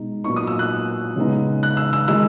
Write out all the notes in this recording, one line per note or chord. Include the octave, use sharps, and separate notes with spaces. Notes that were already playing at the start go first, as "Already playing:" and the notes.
Already playing: B2 G#3 D#4
A#2 F#3 B3 D#4 C#6
D#6
E6
F#6
C#3 G#3 B3 D#4
F#6
E6
E6
D#3 G#3 D#4 E6